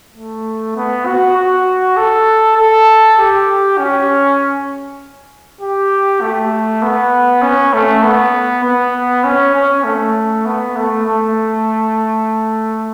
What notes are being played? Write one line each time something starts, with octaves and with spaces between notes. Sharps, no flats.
A3
B3
F#4
F#4
A4
A4
G4
C#4
G4
A3
B3
C#4
A3
B3
B3
C#4
C#4
A3
B3
A3
A3